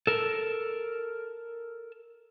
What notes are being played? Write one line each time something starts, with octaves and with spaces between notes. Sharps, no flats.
A4 A#4